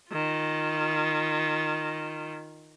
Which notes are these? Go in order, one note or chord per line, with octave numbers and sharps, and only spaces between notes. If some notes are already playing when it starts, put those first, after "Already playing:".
D#3 F4